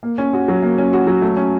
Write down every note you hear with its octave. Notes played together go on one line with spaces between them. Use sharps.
A#3
C#4
F#4
F#3
A#3
C#4
F#4
F#3
A3
C#4